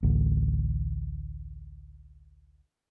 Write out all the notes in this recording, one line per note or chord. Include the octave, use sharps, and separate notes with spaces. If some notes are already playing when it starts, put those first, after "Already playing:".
A1 D2